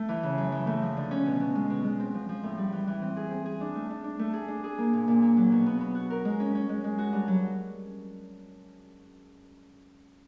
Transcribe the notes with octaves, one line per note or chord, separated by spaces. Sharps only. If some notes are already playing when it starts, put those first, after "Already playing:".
Already playing: A3
E3
C#3
F#2
E3
A3
F3
D3
C#4
B2
B2
G#3
B2
G#3
C4
F3
F3
A2
G3
E3
E3
C4
G#4
C4
G#4
D4
A3
D4
D4
A3
G#4
D4
G#4
A#3
A#2
A#2
A#3
F#3
B2
B3
B3
F#4
A#4
G#3
C#4
C#4
G#3
G#3
F#4
G2
F#3